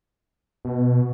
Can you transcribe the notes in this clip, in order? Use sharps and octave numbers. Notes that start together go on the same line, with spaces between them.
B2